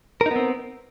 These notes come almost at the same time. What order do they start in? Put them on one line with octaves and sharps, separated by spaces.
A#4 D#4 B3 C4